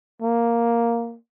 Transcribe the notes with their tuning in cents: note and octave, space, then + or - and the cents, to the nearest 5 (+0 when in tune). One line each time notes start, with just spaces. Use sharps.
A#3 +0